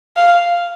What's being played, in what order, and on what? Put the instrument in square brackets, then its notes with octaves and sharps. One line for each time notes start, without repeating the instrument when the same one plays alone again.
[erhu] F5